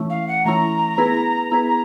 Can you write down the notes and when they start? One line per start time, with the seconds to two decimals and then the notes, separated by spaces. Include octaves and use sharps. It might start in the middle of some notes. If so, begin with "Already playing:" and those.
Already playing: E3 A3 C#4 E4
0.10 F5
0.28 F#5
0.45 E3 A3 C#4 E4 A#5
0.98 B3 E4 G#4 B4
1.52 B3 E4 G#4 B4